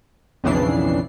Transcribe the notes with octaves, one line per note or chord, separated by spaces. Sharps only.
B1 F2 C#3 E3 D4 C7